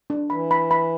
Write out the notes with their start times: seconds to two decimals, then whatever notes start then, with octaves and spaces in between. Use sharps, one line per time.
0.10 D4
0.30 E3 B5
0.51 B5
0.71 B5